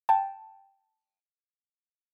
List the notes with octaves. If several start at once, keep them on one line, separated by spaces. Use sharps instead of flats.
G5 A5